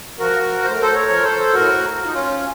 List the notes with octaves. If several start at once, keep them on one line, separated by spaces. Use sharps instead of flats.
F3 F#4 A#4
A2 C5
A#4
A4 C5
A#4 C#5
F3 A#4
A4 C5
A2 F#4 A#4
F3
D#4
C#4 F4